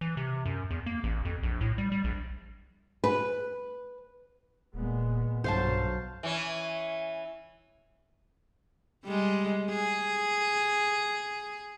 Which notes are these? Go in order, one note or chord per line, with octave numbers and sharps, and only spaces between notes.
E3
C3
F#2
E2
A#3
A1
F2
A#1
A2
G3
G3
A#1
B4
D#1 A#2 G#3 B3
B1 G2 B2 F#3 C5 F5 A5
E3 C#4
G3 G#3
G#4